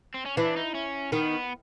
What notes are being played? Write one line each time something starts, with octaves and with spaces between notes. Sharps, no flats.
C4
C#4
E3 D4
D#4
C#4
D#3 B3